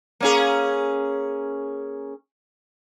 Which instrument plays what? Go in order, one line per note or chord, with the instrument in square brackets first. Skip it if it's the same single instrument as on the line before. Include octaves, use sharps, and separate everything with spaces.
[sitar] A#3 C#4 G#4